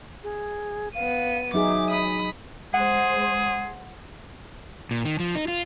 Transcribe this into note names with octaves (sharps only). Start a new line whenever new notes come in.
G#4
B3 F5 D#7
F#3 D#4 G#4 E5 D6
B5 D#6
G#3 G#4 C5 F#5
A#2
D#3
F3
D#4
F4